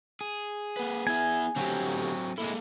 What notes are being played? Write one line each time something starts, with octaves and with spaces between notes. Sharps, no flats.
G#4
A#3 B4
B3 E4 E5 G#5
D3 F#3 A3 C4 G4
G#3 A#3 E4 A4